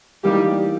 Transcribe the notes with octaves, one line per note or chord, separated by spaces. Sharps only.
E3 G3 A#3 D#4 G4